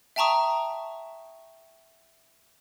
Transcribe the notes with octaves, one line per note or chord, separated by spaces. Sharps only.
E5 G5 A5 A#5 C#6 D#6